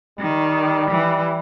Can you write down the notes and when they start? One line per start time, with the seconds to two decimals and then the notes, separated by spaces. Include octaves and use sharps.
0.19 D#3 G3
0.90 E3